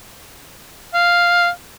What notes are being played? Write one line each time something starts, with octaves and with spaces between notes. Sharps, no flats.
F5